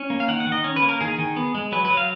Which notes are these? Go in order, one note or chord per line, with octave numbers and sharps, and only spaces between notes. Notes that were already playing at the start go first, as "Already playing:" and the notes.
Already playing: C#4
A#3
F5
D#3 F#5
F#5
D#3
D#5
C#4
B4
A#3
A#4
D#3 G#4
D#3
B3
G#3
F#3 B4
B4
F#3
F5